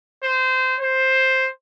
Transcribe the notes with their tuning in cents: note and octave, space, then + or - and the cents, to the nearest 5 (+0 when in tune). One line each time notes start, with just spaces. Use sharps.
C5 -20
C5 +5